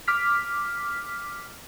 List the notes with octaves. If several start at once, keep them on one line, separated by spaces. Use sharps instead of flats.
D6 F6 B6